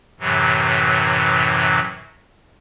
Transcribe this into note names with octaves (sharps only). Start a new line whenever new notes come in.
F#2 A2 C3 E3 F#3